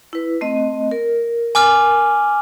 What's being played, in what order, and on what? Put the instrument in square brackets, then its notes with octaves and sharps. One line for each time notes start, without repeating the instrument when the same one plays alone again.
[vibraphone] E4 B4
A3 C4 D#5
A#4
[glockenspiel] G#5 D6 F6